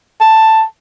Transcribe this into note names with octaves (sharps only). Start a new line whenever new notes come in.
A5